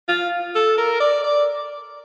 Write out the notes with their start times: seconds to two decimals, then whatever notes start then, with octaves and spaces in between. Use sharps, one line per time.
0.08 F4
0.55 A4
0.77 A#4
1.00 D5
1.24 D5